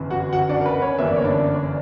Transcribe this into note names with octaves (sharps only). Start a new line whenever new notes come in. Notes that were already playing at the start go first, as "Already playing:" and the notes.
Already playing: G1 F#2 C#3 E3
F#4 F#5
F#4 F#5
D4 D5
A#4
B4
C#4 C#5
G1 F#2 E3 A#3 E5
D5
C#5
D4 D5